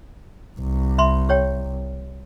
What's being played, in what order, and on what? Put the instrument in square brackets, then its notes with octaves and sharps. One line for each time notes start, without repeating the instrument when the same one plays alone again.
[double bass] C2
[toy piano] E5 B5 C6
G4 C#5 G5